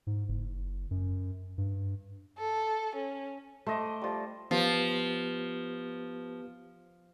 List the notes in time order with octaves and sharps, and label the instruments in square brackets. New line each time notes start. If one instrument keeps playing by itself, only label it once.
[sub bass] G#2
F#1
F#2
G2
[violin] A4
C#4
[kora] A3 [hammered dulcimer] C5 D#5 D6
[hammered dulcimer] F3 G3
[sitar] F3 [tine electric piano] B3 G4 B4